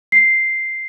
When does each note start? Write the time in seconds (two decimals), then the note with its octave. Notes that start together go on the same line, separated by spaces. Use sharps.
0.12 C7